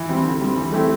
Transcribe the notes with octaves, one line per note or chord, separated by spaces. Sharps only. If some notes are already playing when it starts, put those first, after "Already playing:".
Already playing: E3
G3 C4
D3
G3 C4
E3
A3 C4 E4 G4